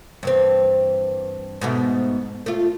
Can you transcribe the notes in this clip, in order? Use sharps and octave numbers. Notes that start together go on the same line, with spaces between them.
G2 E3 C4
G#2 B2 A3
A3 F4